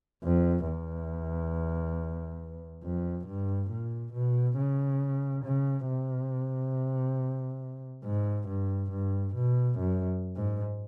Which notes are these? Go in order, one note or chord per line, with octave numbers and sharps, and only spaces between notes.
F2
E2
F2
G2
A#2
B2
C#3
C#3
C3
G#2
G2
G2
B2
F#2
G#2